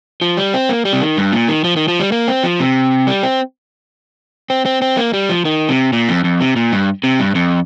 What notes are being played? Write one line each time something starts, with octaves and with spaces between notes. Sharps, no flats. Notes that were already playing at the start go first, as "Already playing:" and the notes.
F3
G3
C4
A#3
G3
C3
D#3
G2
A#2
D#3
F3
D#3
F3
G3
A#3
C4
F3
C3
G3
C4
C4
C4
C4
A#3
G3
F3
D#3
C3
A#2
F2
F2
C3
A#2
G2
C3
G2
F2